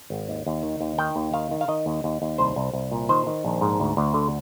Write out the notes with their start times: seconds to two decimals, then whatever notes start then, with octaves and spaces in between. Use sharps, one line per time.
0.10 G#1
0.29 D#2
0.46 D#2
0.63 D#3
0.81 D#2
0.98 D#3 G5
1.16 D#2
1.34 D#3 F5
1.51 D#3
1.61 F5
1.68 D#3 D#5
1.86 D#2
2.04 D#2
2.22 D#2
2.38 C2 C5
2.56 C2
2.73 C2
2.91 A#2
3.09 D#3 C5
3.27 D#3
3.45 A#1
3.61 G#2
3.80 D2
3.97 D2
4.14 D3